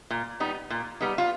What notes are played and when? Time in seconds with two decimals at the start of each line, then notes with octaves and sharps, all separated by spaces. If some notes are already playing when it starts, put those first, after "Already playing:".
0.11 A#2
0.40 G3 B3 D#4
0.70 A#2
1.01 G3 B3 D#4
1.18 F4